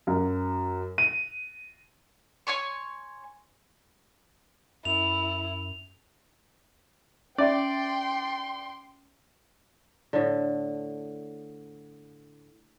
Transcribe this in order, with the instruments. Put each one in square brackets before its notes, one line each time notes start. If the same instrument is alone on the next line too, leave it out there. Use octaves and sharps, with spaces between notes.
[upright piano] F#2
D#7
[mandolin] C#5 G#5 C6 C#6
[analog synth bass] F#2 [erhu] E4 [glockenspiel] F7
[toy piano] C#4 E5 [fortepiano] D5 [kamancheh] G5 C6
[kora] A2 D3